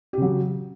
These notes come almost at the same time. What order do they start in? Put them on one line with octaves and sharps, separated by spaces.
G4 C#3 F#3